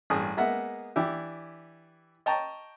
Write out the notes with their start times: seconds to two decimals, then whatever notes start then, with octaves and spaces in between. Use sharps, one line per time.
0.10 A1 G2 G#4 D#6
0.37 G#3 A#3 B3 E5 F#5
0.96 E3 D4 E4 G4
2.26 D#5 G5 A5 A#5 C#6